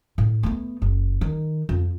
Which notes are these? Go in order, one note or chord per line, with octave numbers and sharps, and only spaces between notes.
A2
A3 B3
F#1
D#3
F2